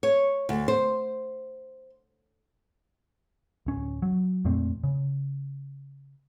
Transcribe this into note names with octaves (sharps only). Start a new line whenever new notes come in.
C#5
D2
C5
D1 C#4
F#3
F2 A#2 A3 C4
C#3